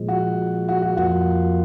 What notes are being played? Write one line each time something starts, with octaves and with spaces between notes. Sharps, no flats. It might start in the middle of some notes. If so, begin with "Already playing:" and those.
Already playing: A#2 F3 G#3
F#4
F#4
F#4
F2 F3 A#3 F4 F#4